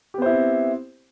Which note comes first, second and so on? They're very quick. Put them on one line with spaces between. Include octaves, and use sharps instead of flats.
G4 B3 C5 E4 C4